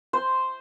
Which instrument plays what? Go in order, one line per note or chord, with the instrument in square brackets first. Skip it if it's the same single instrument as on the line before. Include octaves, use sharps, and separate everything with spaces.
[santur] C5